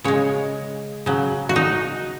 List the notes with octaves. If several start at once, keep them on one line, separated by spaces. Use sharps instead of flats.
C#3 G#3 C#5
C#3 F#3
F#4
D#4